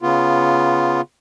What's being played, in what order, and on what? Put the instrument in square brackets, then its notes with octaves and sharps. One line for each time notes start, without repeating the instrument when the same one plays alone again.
[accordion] C#3 B3 F4